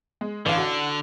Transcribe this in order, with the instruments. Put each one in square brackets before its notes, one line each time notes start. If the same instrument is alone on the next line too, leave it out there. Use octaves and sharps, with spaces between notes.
[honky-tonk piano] G#3
[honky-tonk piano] A1 F5 [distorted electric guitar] D3
[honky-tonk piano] F#4